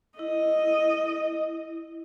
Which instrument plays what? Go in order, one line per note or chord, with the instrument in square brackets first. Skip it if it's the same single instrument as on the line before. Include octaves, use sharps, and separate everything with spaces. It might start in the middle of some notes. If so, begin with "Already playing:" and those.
[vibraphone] E4 [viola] D#5